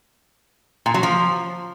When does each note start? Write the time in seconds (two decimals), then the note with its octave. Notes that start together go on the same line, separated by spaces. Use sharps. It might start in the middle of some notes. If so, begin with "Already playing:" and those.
0.86 A#2
0.94 F#3
1.03 F3